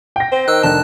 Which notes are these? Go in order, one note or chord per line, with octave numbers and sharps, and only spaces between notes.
G5 A#6
C4 C5
D#3 E6 F#6
F1 D4 A5 F#6